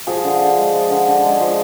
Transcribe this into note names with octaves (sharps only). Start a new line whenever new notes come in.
F3 G#4
D3
D3
G#3
F3
D3
D3
G#3
F3